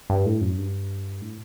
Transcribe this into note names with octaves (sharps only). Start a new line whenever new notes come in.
G2
A2
F#2
G2
A2